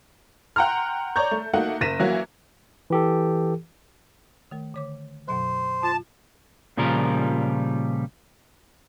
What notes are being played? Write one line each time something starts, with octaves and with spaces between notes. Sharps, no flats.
F#5 G5 A#5 C6 F6
C#5 D5 A#5 C#6 G6
A3
A3 A#3 D#4 F#4 F#5
F#1 A#4 A#6 B6 D#7 E7
E3 F#3 A#3 F#4
E3 G4 A4
D#3 A3 A#4
D3 C#5 D6
F#2 B2 F#3 C5
F4 A5
A#2 C#3 F3 G3 F4 A#4